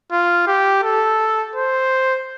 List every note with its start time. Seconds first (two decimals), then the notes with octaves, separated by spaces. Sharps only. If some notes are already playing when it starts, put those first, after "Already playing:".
0.12 F4
0.47 G4
0.83 A4
1.55 C5